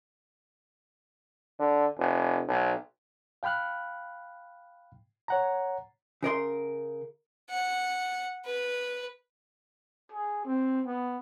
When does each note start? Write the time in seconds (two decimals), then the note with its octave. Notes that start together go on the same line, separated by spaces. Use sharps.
1.59 D3
1.99 F1
2.48 B1
3.43 F5 G5 B5 F6 F#6
5.28 C#5 F#5 A#5
6.23 C#3 A#4 D5 C6
7.50 F#5
8.46 B4
10.12 G#4
10.45 C4
10.86 B3